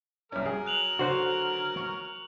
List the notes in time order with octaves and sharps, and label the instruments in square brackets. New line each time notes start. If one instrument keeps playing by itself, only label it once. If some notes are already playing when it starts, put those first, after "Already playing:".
[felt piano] C2 C#4 [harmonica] F#3 A#4
[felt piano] G#4
[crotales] F#6 F7 F#7
[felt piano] D3 [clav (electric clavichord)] F#4 C5 F#5
[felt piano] C#6